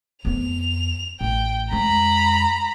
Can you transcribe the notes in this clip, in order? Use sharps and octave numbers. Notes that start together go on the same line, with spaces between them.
F2 B3 F7
A1 G5
F2 G#3 A#5 B5